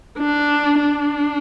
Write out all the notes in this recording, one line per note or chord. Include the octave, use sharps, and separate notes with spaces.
D4
D4